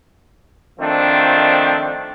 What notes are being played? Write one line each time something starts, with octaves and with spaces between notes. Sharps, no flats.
D#3 F3 A3 C4 D4